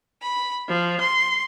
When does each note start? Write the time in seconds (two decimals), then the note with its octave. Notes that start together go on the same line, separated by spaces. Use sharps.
0.22 B5
0.69 F3
1.00 C6